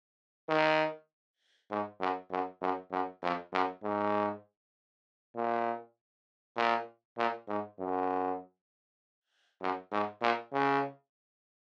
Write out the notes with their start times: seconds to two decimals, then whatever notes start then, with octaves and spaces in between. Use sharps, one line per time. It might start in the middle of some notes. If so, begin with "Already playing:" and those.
0.49 D#3
1.70 G#2
2.00 F#2
2.31 F#2
2.61 F#2
2.91 F#2
3.23 F2
3.53 F#2
3.83 G#2
5.36 A#2
6.56 A#2
7.18 A#2
7.48 G#2
7.79 F#2
9.61 F#2
9.92 G#2
10.22 A#2
10.53 C#3